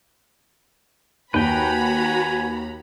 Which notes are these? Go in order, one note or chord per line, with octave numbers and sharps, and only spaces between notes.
D#2 F#4 B4 G5 G#5 A#5 B5